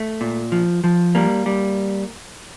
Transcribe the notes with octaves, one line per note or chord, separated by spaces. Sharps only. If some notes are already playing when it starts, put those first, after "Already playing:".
Already playing: A3
A#2
F3
F3
G3 A#3
G3